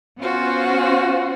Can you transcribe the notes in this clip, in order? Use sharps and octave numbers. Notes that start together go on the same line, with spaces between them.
B3 C#4 F4 F#4 C5